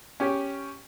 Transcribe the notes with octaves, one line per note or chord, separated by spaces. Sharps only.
C#4 G4 C#5